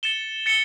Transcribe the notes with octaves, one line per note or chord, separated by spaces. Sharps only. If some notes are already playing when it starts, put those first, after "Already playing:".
A6 C#7 E7 G7
A6 C#7 E7 G7